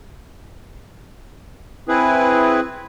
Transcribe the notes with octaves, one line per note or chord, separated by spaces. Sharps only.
C4 E4 G#4 B4